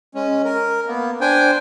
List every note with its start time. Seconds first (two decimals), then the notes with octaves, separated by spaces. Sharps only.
0.15 G#3 C#4
0.44 A#4
0.87 A#3 B3
1.21 D4 C5 G5 G#5